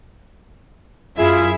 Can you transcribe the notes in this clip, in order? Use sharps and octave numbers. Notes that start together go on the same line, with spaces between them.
F#2 E4 F4 G#4 E5